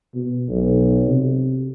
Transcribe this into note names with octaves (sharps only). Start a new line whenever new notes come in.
B2
B1
C3